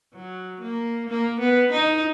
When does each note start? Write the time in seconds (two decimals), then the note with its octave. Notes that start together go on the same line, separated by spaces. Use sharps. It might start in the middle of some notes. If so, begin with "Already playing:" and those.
0.14 F#3
0.61 A#3
1.09 A#3
1.39 B3
1.72 D#4